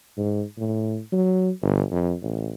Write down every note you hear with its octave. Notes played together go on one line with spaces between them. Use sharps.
G#2
A2
F#3
G1
F2
A1